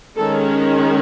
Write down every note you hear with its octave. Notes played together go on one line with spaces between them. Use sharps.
D#3 G#3 C#4 A4